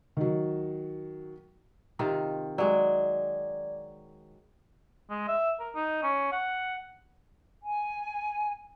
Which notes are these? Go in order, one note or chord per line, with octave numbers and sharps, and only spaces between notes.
D#3 F#3
C3 D#3 F4
F#3 G#3 D5
G#3
E5
A#4
D#4
C#4
F#5
G#5